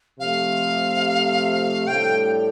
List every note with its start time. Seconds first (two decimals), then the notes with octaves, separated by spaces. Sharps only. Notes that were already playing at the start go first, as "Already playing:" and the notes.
0.19 C3 F3 A3 F5
1.87 A2 G3 D4 A4 G5